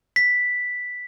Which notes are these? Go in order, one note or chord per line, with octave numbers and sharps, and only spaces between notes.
B6